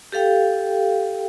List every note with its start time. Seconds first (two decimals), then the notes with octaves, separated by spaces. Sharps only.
0.12 G4 A4 F5 G5